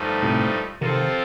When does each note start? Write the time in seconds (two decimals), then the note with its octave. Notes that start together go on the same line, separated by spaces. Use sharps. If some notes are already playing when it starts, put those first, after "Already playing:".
Already playing: G2 F3 A3 D#4
0.22 A2 C3
0.81 C3 D#3 F3 C4 F4 A4